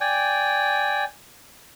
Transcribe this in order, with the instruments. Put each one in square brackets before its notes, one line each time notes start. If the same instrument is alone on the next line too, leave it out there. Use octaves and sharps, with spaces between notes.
[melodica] D5 G5 G#5